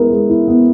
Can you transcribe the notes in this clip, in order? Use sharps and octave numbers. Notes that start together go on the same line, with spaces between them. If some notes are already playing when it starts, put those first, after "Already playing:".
Already playing: G#3 B3 E4 A#4
G#3
E4
B3